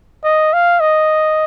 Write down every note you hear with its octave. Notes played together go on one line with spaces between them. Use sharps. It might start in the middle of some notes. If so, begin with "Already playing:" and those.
D#5
F5
D#5